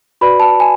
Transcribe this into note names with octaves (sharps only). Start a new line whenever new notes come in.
F#4 B4 D5 B5
A5
G#5